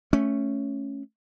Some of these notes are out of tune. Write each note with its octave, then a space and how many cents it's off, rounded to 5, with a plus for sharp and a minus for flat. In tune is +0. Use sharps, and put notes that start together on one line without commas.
A3 +0 C#4 +0